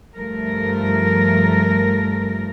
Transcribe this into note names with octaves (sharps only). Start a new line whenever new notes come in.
G2 F3 A3 A#4